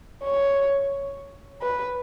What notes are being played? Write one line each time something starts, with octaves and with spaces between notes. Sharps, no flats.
C#5
B4